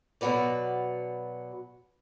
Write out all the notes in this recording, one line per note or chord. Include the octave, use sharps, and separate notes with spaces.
B2 F#3 F#4 B4 D5